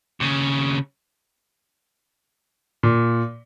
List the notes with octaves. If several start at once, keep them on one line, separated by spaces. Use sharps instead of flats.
D#2 C#3
A#2